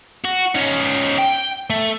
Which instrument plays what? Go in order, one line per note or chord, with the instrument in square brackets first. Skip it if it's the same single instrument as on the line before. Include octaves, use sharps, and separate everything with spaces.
[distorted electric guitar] F#4
C#4 D#4
G5
A3